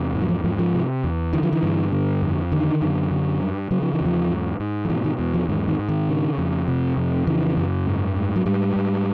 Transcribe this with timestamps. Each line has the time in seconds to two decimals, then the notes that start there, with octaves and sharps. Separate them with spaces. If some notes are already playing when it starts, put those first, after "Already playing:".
Already playing: E2 C3
0.14 G#2
0.22 F#3
0.29 F3
0.44 G#2 F3
0.59 F3
0.74 C3
1.04 E2
1.33 D3 E3
1.43 F3
1.53 E3
1.63 G2
1.92 D3
2.22 F2
2.52 D3 D#3
2.81 F#2
3.11 D3
3.41 G2
3.71 C#3 F#3
3.82 F3
3.94 E3
4.01 E2
4.06 F3
4.30 G#2
4.60 G#2
4.85 F3
4.89 B2 E3
5.04 D#3
5.19 E2
5.34 F3
5.49 G#2 D#3
5.68 D#3
5.79 G#2
5.89 D#3
6.08 C#3
6.38 F2
6.68 C3
6.97 F2
7.27 C#3 E3
7.57 F#2
7.87 G#2
8.16 G#2
8.36 F#3
8.46 G#2 G3
8.76 G#2